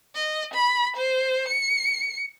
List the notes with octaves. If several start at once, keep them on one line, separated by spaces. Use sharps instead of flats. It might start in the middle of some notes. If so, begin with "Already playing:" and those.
D#5
B5
C5
C#7